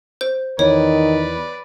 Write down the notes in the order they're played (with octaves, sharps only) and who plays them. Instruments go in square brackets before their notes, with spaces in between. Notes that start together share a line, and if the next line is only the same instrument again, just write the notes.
[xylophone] C5 G6
[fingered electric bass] E2 [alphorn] D#3 [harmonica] B4 D5 [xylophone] C#5